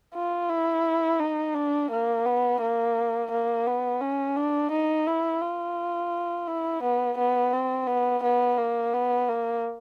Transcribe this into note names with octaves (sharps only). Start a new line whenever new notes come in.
F4
E4
D#4
D4
A#3
B3
A#3
A#3
B3
C#4
D4
D#4
E4
F4
E4
B3
B3
C4
B3
B3
A#3
B3
A#3